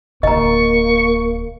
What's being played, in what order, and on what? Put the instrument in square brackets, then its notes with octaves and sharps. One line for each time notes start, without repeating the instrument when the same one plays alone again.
[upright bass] D1 D3 [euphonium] A#3 [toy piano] D#5 A#5 [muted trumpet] C#6